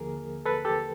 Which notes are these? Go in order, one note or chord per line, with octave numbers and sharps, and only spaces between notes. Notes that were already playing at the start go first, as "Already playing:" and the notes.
Already playing: D#2 D3 F3 A#3 G#4 A#4
A4 B4
G4 A4